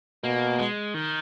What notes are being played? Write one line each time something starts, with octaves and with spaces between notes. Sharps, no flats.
B2 A#3
G#3
D#3